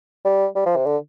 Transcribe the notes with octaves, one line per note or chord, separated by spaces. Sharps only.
G3
G3
F3
C3
D3